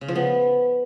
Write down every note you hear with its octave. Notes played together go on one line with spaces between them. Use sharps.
C#3
F3
B3